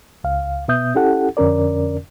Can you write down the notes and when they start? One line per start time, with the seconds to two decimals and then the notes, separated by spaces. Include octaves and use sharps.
0.24 C#2 F5
0.68 B2 B3 E5 D#6 G6
0.95 C#4 E4 G4 A4 F#5
1.37 F2 D3 C#4 A#4 D5